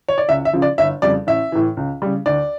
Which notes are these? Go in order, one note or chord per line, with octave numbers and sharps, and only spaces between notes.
C#5
D5
C#2 E5
E5
C#3 F3
D5
G1 E5
F2 C#3 G3 D5
A1 E5
A2 E3
C#2
C#3 G3
D2 D5